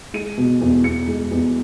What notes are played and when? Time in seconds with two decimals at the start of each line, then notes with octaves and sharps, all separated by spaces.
0.14 G#3 D#7
0.38 B2
0.61 E2
0.84 E2 C#7
1.08 G#3
1.31 E2